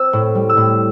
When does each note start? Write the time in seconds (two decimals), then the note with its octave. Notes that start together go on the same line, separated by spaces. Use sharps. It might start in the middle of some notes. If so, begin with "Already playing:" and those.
Already playing: C4 E6
0.13 A2
0.35 G3
0.50 E6
0.57 A2